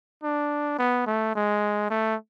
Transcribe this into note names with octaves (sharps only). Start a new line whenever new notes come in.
D4
B3
A3
G#3
A3